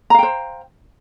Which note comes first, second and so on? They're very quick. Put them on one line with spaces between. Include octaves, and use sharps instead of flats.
A#5 F5 G5 C5